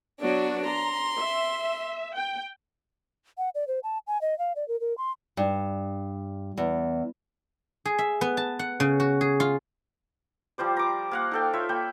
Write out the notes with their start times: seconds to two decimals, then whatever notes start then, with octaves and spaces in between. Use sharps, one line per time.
0.21 F#3 B3 D4 F#4 D5
0.67 A#5 C6
1.18 E5
2.16 G5
3.38 F#5
3.55 D5
3.68 C5
3.83 A5
4.07 G#5
4.21 D#5
4.39 F5
4.56 D5
4.68 A#4
4.80 A#4
4.98 C6
5.37 G2
6.57 E2
7.86 G#4
7.98 E5
8.21 B3
8.37 A5
8.59 F#5
8.80 C#3
9.00 F#4
9.21 G#4
9.40 F4
10.58 F3 G3 C5 D5
10.77 A#5 D6
11.11 A#3 F5 F#5
11.31 D#4 A4 G5
11.53 F4 C#5 E5
11.69 A#3 G5 B5